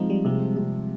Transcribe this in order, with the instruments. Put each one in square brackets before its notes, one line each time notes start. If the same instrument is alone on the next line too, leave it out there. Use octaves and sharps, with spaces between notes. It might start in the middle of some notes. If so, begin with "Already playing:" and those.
Already playing: [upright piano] F3 D#4 [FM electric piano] G#3 C4
[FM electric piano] G3
[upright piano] C3 [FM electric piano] G#3
[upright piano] C3